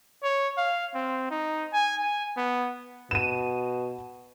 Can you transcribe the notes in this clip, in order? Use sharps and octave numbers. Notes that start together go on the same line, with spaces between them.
C#5
F5
C4
D#4
G#5
G#5
B3
B2 D#7 E7